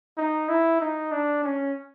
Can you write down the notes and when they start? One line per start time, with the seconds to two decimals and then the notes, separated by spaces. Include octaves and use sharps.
0.17 D#4
0.49 E4
0.81 D#4
1.12 D4
1.44 C#4